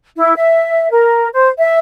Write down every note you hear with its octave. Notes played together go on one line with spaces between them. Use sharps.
E4
E5
A#4
C5
E5